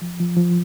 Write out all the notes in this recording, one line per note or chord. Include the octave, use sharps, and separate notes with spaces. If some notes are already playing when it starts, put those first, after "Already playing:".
F3
F3
F3